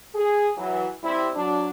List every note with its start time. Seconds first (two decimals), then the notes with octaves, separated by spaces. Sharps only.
0.15 G#4
0.57 E3 F#3
1.03 G3 C4 E4
1.35 F#3 D4